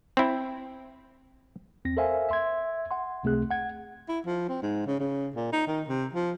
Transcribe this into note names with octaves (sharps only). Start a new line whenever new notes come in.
C4 E4
E2 C4 A#6
A4 A#4 C5 E5 F5 G#5
E5 C6 G#6
F#5 C6
C#2 C3 A3 C4 G#4 F#6
F#5 G#6
E4
F3
C4
G#2
C#3
C#3
A#2
D#4
D#3
C3
F3